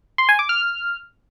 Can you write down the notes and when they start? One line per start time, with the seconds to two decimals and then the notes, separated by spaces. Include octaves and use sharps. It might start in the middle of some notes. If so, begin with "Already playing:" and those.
0.18 C6
0.29 G#5
0.39 D6
0.49 F6